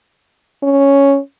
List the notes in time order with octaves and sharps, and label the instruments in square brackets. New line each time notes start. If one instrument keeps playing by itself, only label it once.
[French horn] C#4